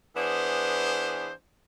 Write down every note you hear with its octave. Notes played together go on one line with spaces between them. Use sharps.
E3 B3 D4 G#4 C5